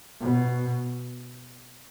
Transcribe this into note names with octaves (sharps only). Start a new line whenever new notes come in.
B2